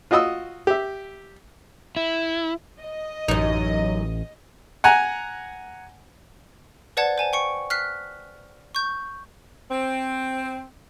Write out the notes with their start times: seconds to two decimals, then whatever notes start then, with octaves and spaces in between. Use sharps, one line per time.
0.11 F4 F#4 D#5 D#6 E6
0.67 G4 E5
1.96 E4
2.79 D#5
3.28 A1 F#2 D#4
4.84 F#5 G#5 A#5
6.97 B4 C5 D5 F#5 A5 G#6
7.18 C5 G#5 A5
7.33 G5 C#6 C#7
7.70 F6 F#6 B6 C7
8.75 C#6 G6
9.71 C4